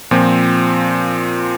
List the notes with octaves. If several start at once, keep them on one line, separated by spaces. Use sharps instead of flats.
A#2 F3 C4